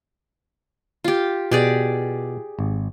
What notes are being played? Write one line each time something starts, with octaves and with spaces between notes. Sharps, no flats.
F4 G4
B2 G4 G#4 D5
G#1